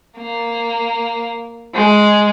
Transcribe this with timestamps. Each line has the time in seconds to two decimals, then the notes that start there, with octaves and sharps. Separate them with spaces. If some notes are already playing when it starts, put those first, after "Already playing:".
0.18 A#3
1.74 G#3